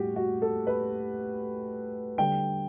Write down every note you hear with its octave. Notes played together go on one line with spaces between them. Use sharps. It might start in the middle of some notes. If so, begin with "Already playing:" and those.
Already playing: A2 G3 F#4 G4
F#4
A4
B4
D3 G3 G5